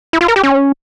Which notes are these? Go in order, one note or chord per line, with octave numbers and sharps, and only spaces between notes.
E4
F4
A#4
G4
C#4